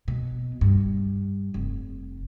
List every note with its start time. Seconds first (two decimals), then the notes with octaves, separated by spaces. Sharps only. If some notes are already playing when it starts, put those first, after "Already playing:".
0.08 B2
0.61 G2
1.54 F1